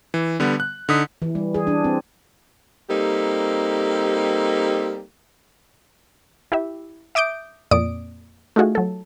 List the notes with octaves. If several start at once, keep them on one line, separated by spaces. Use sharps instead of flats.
E3
D3 G3 B3
F#6
D3 D#4 D#6 B6
E3
G3
G#4
D4
C4
G3 A#3 C4 D#4 G4 A4
E4 G4 E5
E5 D6 D#6 G6 D7
F2 A#2 D5 D#6 D7
A3 D#4 F4 F#4 G#4
F#3 A4